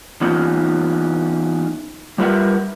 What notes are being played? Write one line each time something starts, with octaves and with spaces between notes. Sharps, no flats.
E3 B3 C#4 D#4 F4
G3 F4 A#4 B4 E5 F#5